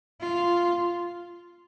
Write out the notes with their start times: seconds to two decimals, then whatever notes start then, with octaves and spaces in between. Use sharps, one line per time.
0.20 F4